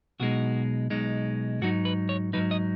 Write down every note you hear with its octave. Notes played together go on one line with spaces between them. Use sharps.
B1 B2 G#3 D#4 F#4
B1 B2 G#3 D#4
G#2 F#3 D#4 F#4
B4
C#5
G#2 F#3 D#4 B4
D#5